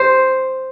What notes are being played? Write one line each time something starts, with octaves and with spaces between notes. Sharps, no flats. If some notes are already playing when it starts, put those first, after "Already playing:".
Already playing: C5